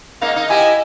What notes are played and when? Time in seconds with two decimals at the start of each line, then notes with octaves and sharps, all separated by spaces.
0.22 G#2 A#3 D#4 F5
0.36 D#4 D#5
0.50 E4 G4 G#5